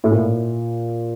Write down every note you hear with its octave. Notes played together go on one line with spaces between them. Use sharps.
A2
A#2